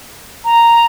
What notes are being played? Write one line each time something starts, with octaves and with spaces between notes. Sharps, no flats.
A#5